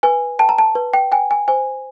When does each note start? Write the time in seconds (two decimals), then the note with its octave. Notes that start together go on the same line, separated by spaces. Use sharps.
0.03 B4 G#5
0.39 G5 A5
0.49 A#5
0.58 A5
0.75 B4
0.93 G5
1.12 G5 G#5
1.31 G#5
1.48 C5 G#5